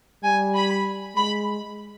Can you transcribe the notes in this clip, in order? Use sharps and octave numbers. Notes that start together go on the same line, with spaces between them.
G3 G#5
B5
G#3 B5